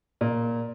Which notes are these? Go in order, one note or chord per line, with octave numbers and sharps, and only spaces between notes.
A#2